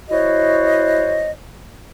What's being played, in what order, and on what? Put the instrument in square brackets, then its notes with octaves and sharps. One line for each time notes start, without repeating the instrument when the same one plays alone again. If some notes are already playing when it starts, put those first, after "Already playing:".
[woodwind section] E4 F#4 C5 C#5 D#5